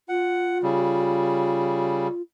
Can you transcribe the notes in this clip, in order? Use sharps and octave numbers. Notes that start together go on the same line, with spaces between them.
F4 F#5
C#3 G3